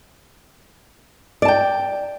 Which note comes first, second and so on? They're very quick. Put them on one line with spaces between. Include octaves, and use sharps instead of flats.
D5 A5 G5